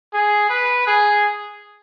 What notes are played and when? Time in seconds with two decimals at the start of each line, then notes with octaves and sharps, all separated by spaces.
0.13 G#4
0.49 B4
0.87 G#4